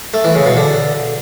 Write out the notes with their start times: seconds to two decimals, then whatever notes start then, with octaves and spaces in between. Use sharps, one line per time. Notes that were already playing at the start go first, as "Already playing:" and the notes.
0.14 A3
0.25 E3
0.35 C#3
0.46 B2
0.57 D3